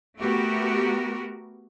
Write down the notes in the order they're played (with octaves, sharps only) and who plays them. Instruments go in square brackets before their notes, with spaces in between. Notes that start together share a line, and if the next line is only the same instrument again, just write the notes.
[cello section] A3 B3 F#4 G4 A#4